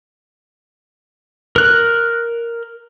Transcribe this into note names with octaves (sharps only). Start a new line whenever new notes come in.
A#4 F#6